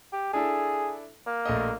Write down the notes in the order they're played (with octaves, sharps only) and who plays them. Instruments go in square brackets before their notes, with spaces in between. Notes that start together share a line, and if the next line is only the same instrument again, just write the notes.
[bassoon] G4
[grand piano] D4 E4 A4 [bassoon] G#4
[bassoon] A#3
[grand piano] A#1 A3 D#5